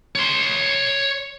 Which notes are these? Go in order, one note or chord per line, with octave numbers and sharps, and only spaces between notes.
C#5 C6